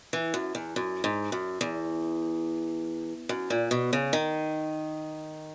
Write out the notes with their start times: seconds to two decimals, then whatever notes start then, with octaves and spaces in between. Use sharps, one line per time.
0.13 E3
0.34 F#2
0.55 E2
0.76 F#2
1.04 G#2
1.32 F#2
1.61 E2
3.29 F#2
3.50 A#2
3.71 B2
3.93 C#3
4.13 D#3